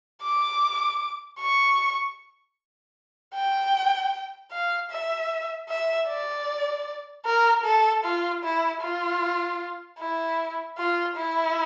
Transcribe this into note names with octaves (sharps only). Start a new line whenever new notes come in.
D6
C#6
G5
F5
E5
E5
D5
A#4
A4
F4
E4
F4
E4
F4
E4